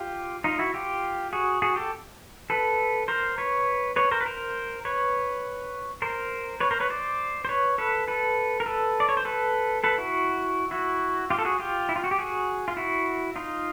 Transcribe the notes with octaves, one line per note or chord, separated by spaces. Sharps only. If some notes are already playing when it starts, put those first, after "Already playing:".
Already playing: F4 G4
D#4 F4
E4 F#4
F4 G4
F#4 G#4
F#4 G#4
G4 A4
A4 B4
A#4 C5
B4 C#5
B4 C#5
A#4 C5
B4
A#4 C5
B4 C#5
A#4 C5
B4 C#5
A#4 C5
B4 C#5
C5 D5
C5
B4 C#5
A4 B4
A4 B4
A#4
A4 B4
D5
C#5
C5
A4 B4
A4 B4
E4 F#4
E4 F#4
F4 G4
A4
F#4 G#4
F4 G4
E4
F4
F#4
G4
F#4 G#4
F4
E4 F#4
D#4 F4